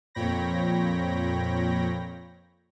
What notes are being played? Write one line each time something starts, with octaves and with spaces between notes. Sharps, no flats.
F2 A#2 C#5 G5 B5 A#6